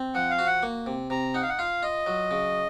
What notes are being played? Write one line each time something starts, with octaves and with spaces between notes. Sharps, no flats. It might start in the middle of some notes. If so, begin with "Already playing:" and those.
Already playing: C4
F3 F#5
F5
F#4
F#5
A#3
C3
C3 A#5
D#4 F#5
F5
F#5
F4 F5
F4 D#5
F#3
C#3